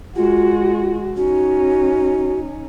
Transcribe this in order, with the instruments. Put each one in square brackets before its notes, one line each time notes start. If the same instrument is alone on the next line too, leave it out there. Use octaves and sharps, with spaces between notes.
[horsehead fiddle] G#3 F#4 [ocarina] F4
[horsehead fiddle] C#4 D#4 [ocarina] F#4